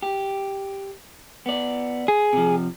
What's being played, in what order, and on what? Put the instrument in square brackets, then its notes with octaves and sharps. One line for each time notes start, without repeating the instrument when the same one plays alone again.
[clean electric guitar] G4
B3 D5
[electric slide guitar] G#4
[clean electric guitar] C3 F3